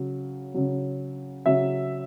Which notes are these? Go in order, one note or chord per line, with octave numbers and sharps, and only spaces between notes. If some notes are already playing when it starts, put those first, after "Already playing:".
Already playing: C#3 F#3
C#3 F#3
C#3 F#3 E5